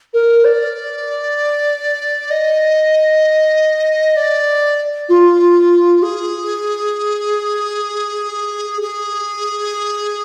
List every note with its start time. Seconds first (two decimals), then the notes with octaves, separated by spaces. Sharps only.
0.13 A#4
0.44 D5
2.30 D#5
4.16 D5
5.09 F4
6.02 G#4
8.81 G#4